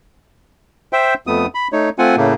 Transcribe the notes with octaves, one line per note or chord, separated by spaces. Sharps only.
C5 E5 G5
F2 A3 B3 D#6
B5
A3 D#4 C#5
A3 C4 F4 F#5 G#5
A2 C#3 A3 A#3